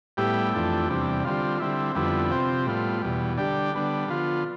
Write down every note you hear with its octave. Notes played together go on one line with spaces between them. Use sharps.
A2 G3 B3 E4 G4
F2 E3 A3 D4 G4
E2 C3 G3 D4
D3 G3 C4 F4
D3 G3 C4 E4
F2 D3 G3 B3 E4
C3 F3 C4 G4
A2 G3 B3 F4
E2 B2 G3
D3 G3 D4 G4
D3 G3 B3 D4
D3 F3 B3 F4